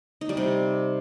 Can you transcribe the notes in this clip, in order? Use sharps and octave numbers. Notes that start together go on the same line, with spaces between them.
D#4
G3
C3